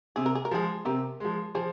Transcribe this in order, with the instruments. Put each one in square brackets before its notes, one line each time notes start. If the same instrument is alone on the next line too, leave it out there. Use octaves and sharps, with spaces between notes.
[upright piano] C3 [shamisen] G#4
[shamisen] A#4
G#4
A#4
[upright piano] F3 G#3 [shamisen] F4 G#4
[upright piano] C3 [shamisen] G4 A#4
[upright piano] F3 G#3
[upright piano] F3 [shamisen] G#4 C5